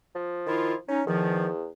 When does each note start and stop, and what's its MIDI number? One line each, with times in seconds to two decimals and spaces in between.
0.15 0.79 53
0.46 0.74 51
0.46 0.74 64
0.46 0.74 65
0.88 1.02 61
0.88 1.02 63
1.07 1.68 40
1.07 1.48 51
1.07 1.48 53